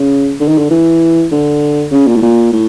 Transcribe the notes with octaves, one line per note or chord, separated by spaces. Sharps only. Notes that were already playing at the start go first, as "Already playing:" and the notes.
Already playing: C#3
D3
D#3
D3
E3
D3
C#3
A#2
A2
A#2
A2